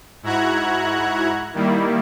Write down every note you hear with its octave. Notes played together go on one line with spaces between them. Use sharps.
G#2 E4 F#4 A#5 F#6 G#6
D#3 G3 A#3 E4